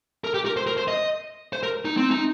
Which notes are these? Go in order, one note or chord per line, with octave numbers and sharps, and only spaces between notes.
A#4
G4
A#4
C5
A#4
C5
D#5
C5
A#4
D#4
C4
D#4